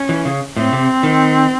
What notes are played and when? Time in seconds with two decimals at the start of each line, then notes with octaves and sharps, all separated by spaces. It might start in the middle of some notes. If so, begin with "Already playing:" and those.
Already playing: C#4
0.09 E3
0.25 C#3
0.56 A2 C4
0.72 C3
1.03 D#3